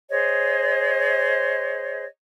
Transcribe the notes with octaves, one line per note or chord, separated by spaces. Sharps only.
G#4 C5 C#5 D#5